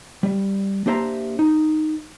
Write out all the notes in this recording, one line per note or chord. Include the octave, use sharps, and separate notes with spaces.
G3
A#3 D4 G4 C5 E5 A#5
D#4